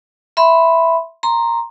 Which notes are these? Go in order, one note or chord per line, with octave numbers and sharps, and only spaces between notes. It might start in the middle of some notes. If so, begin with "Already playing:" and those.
E5 B5 C6
A#5 C6